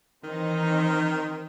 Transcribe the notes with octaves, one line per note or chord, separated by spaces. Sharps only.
D#3 E3 C4 D#4